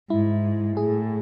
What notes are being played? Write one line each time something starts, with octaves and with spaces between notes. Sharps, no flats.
G#2 E4
A2 G#4